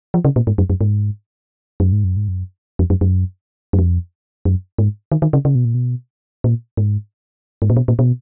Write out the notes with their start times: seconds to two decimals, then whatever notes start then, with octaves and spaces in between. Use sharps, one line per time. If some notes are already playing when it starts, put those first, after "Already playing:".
0.14 F3
0.25 C#3
0.36 A#2
0.47 G#2
0.58 F#2
0.70 F#2
0.81 G#2
1.80 F#2
1.92 G#2
2.04 F#2
2.17 G#2
2.28 F#2
2.79 F2
2.90 F#2
3.01 F#2
3.73 F#2
3.79 F2
4.45 F#2
4.78 G#2
5.12 D#3
5.22 D#3
5.33 C#3
5.45 C#3
5.55 B2
5.65 A#2
5.74 B2
6.44 A#2
6.77 G#2
7.62 G#2
7.70 A#2
7.77 B2
7.88 A#2
7.99 B2